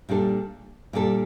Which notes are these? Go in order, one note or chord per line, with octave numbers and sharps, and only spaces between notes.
A#2 G3 D4 A4
A#2 G3 D4 A4